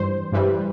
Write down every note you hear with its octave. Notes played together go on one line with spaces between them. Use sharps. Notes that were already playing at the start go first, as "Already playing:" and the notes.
Already playing: G2 E3 G3 C5
G2 E3 G3